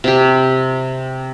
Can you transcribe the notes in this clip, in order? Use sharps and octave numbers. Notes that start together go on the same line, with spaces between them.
C3 G4